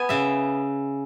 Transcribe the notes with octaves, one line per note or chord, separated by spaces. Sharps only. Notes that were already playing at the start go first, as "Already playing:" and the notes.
Already playing: B3 G#5
C#3 E5